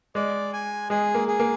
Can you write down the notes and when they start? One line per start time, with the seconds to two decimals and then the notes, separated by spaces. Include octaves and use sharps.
0.15 G#3 D5
0.53 G#5
0.90 G#3 G#4
1.15 A#3
1.28 G#4
1.40 A#3